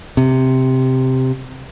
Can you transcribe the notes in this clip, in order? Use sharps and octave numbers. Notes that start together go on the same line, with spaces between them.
C3